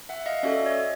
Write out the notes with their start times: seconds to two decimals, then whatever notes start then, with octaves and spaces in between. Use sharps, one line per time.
0.09 E5 F#5
0.26 D#5 F5
0.43 C#4 F#4 A4 D5 E5
0.66 C#5 D#5